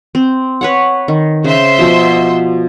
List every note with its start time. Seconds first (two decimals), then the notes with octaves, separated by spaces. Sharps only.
0.15 C4
0.61 B4 C#5 F#5
1.08 D#3
1.44 C#3 C5 E5 C6
1.78 B2 F3